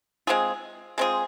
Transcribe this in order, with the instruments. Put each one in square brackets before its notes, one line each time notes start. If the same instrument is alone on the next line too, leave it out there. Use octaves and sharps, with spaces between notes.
[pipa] G#3 C4 F4 G#4
G#3 C4 F4 G#4